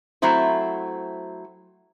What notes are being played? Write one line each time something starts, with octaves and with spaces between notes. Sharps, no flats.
F#3 A3 C4 E4 C5